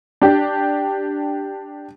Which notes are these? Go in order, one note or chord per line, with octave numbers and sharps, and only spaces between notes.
D4 G4